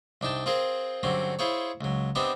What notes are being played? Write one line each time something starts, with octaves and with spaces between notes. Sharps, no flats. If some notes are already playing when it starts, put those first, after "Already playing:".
C2 D4 D#4 G5 A5
C4 F4 G#4 A#4 C5
G2 D3 F#3 C4 C#4
E4 F4 G#4 C5 C#5
C#2 F#3
B3 C4 D4 G4 D#5 E5